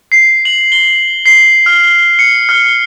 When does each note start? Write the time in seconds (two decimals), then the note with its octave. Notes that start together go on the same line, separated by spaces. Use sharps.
0.12 C7
0.45 F#7
0.72 G7
1.26 C7
1.66 F6
2.19 C#7
2.49 F6